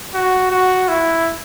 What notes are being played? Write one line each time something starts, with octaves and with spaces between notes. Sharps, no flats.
F#4
F#4
E4